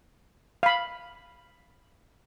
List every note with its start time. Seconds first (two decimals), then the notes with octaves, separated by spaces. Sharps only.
0.63 F5 B5